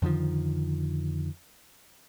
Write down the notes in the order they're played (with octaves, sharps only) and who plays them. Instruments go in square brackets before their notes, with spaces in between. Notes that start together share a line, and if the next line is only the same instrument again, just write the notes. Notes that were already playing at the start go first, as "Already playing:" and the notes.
[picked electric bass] F2 D3 D#3 F3